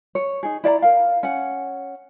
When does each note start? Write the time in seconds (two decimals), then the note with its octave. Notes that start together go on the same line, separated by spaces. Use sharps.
0.15 C#5
0.43 D#4 G#4
0.64 E4 D5 F5 A#5
0.82 A#4 F5
1.23 C#4 F#5